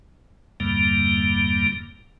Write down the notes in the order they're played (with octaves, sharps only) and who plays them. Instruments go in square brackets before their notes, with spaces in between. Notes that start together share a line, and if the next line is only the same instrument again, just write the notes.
[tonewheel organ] E2 G2 A#2 D3 G3 A#3